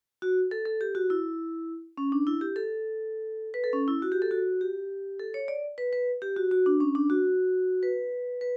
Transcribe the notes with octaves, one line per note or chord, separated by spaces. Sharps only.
F#4
A4
A4
G4
F#4
E4
C#4
D4
E4
G4
A4
B4
A4
C#4
E4
F#4
G4
A4
F#4
G4
A4
C#5
D5
B4
B4
G4
F#4
F#4
D4
C#4
D4
F#4
B4
B4